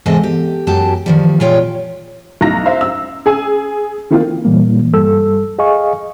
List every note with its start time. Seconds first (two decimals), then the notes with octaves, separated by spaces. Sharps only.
0.06 E2 G#2 C3 C4 A4 D#5
0.23 G4
0.67 F#2 F#3 G4 A5
1.06 D#3 F3 G3
1.40 A#2 G3 F4 C#5 G5
2.41 B1 E4 A#5 A#6
2.66 C5 E5 F5
2.81 E6
3.26 G#4 G#5 E6
4.10 D#3 E3 A#3 C4 F4
4.45 A#2 E3 G3 A#3
4.93 G2 G3 A4 E6
5.59 G#4 D#5 F5 G#5 C#6